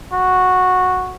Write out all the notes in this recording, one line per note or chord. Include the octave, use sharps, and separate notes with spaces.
F#4